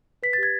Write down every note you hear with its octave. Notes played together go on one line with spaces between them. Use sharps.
B4 B6
A6
G4 G#6